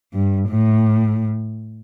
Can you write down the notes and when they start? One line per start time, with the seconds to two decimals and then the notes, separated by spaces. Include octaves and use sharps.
0.13 G2
0.49 A2